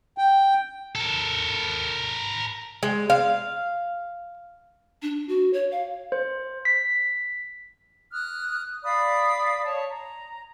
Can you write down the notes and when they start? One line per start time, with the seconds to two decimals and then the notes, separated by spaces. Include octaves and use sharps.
0.18 G5
0.95 A4 A#4
2.83 G#3
3.10 F5
5.02 D4
5.29 F#4
5.53 C#5
5.71 F5
6.12 C5
6.65 B6
8.13 D#6 F6 F#6
8.84 D5 F5 B5 D#6
9.65 C#5 A5
9.90 A#5